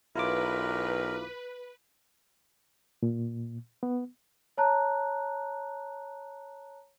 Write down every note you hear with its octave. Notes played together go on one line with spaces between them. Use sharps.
B1 E4 F4 A#4 B4 D6
A#2
B3
C#5 A5 A#5 F#6